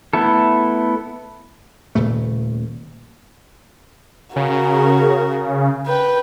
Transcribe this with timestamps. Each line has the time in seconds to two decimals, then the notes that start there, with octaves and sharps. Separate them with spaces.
0.13 A3 B3 E4 A4
1.95 D#1 A#2 C#3 A3
4.36 C#3 F#4 A#4
5.87 B4 G5